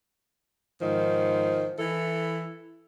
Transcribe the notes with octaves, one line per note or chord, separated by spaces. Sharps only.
G#2 D#3 F3
E3 E4 A4